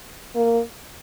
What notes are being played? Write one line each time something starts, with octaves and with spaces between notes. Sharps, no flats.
A#3